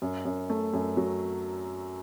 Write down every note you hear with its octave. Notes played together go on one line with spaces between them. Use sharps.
F#2
F#2
A3
F#2
F#3